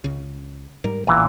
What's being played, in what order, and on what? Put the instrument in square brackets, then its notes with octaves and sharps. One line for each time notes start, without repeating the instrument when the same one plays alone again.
[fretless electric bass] C#2 C#3
[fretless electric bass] G#2 G3 [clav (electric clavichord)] A#4
[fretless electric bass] A1 [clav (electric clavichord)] E2 A#2 E3